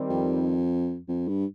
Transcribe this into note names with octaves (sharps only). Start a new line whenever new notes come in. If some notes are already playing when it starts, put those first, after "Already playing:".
Already playing: D#3 G3 C4
F2
F2
G2